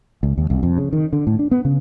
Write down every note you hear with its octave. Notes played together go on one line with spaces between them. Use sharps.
C#2
D#2
C2
F2
C#3
D#3
D3
A2
D4
B3
C#3